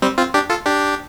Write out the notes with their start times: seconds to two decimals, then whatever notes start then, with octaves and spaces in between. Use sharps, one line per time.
0.02 G3 C4
0.18 C4 F4
0.34 D4 G4
0.49 F4 A4
0.66 D4 G4